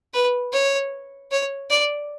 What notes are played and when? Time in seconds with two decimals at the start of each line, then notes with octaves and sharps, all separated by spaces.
0.14 B4
0.53 C#5
1.31 C#5
1.70 D5